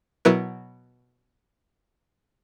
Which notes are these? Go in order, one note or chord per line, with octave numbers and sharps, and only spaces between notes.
B2 F#3 B3 E4 A#4 B4